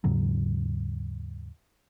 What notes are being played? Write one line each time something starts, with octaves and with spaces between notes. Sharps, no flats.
D#2 G#2 C#3 F#3